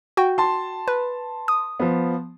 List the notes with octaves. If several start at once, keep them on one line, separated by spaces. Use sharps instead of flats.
F#4 G5
A5 C6
B4
D#6
F3 B3